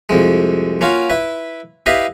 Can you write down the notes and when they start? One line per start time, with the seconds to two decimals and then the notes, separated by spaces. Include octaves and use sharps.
0.09 C2 F2 G#3
0.81 A#3 C#4 F4 F#4
1.10 E4 B4
1.86 E4 G4 B4 D#5 F5